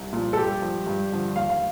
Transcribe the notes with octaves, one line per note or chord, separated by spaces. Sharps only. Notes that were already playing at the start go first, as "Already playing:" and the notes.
Already playing: C2
A#2 F3
A4
G2 G4
F3
G2
D3 F3
D#2 F5
F5